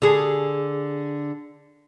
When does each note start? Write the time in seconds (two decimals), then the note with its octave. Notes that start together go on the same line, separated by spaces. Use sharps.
0.02 D3 G#4